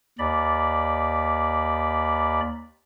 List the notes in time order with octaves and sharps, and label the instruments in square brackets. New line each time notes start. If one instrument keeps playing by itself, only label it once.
[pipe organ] D#2 D5 B5